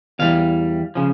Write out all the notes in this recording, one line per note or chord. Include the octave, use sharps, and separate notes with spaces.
E2 E3 G3 F5
C#3 F3